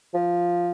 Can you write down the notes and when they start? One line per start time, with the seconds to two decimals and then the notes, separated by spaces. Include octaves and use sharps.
0.14 F3